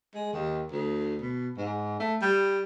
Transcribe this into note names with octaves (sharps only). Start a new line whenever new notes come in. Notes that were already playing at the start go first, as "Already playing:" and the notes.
G#3
D#2
D2
B2
G#2
A3
G3